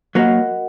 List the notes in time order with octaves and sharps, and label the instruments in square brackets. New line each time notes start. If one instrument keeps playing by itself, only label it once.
[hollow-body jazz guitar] F#3 A#3 [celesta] F#4 A#4 D#5 F#5